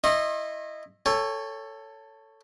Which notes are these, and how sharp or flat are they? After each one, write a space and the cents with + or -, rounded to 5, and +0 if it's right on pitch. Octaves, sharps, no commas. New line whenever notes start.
E4 +0 D#5 -15 C6 +40
A4 +10 C#5 +5 G#5 -40